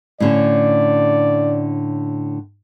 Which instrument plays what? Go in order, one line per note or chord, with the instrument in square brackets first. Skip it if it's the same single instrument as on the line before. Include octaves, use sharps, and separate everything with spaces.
[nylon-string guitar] A2 D3 C#4 [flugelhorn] D5